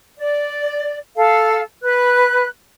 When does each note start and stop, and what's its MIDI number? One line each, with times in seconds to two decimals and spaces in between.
0.18 0.97 74
1.16 1.62 69
1.16 1.62 77
1.83 2.47 71
1.83 2.47 90